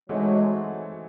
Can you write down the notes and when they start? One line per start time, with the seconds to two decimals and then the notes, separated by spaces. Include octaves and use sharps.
0.09 E3 F#3 G#3 A3 C4 D#4 F#4